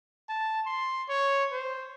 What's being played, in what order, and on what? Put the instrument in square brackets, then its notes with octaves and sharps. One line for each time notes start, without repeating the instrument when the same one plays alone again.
[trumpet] A5
C6
C#5
C5